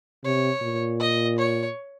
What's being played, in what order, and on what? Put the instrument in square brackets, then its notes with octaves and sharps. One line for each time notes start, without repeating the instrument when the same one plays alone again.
[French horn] C3 [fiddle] C#5
[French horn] A#2
[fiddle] D#5
C#5